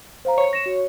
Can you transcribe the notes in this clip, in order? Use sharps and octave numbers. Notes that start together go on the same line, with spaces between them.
C5 F5 A#5
C#5
A#6 E7
F#4